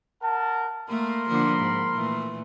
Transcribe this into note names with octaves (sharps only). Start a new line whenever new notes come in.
A#4 F#5 A5
A3 A#3 A#4 B5 C6
D3 F3 A#3
G#2
A#2 E3 A3